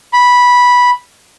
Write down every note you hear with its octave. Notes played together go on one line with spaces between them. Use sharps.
B5